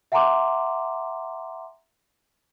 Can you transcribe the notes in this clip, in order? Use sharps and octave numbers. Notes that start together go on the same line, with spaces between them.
E5 F#5 G#5 A#5 C6 D6